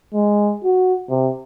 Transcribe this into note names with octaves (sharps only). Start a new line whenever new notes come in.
G#3
F#4
C3